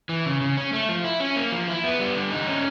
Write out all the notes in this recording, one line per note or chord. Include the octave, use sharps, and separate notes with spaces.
E3
C#3
C#3
C#4
A3
F3
E4
C#4
A#3
F3
E4
B3
G3
D3
D#4
C#4